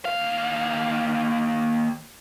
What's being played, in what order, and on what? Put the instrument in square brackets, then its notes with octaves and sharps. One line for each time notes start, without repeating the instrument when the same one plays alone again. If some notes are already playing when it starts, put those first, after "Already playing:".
[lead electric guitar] D#2 F5